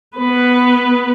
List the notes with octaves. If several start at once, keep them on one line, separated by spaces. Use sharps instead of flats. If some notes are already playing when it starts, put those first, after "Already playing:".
B3 B4